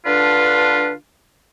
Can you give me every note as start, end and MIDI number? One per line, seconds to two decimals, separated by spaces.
0.06 0.93 50
0.06 0.93 62
0.06 0.93 65
0.06 0.93 71